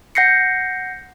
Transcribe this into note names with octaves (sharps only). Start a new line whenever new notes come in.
F#5 G6 A#6 C7 C#7